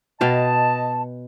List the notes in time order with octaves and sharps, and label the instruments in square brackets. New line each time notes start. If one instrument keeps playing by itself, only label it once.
[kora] B2 F5 G5 [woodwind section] D#5 A5